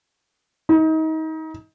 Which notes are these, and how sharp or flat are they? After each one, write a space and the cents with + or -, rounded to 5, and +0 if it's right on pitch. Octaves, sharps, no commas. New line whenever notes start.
D#4 +30